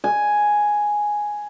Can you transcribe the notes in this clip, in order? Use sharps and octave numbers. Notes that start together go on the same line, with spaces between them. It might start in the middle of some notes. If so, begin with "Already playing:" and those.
G#5